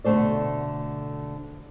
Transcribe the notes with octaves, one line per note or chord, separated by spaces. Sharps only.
B2 D3 F#3 A3 C5 D5